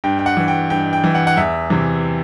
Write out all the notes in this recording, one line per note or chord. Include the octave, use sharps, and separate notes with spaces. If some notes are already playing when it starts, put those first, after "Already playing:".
G2 G5
G5
F#5
E3
G5
G2 G5
G5
E3
F#5
F#5
E2 E5
C3 E3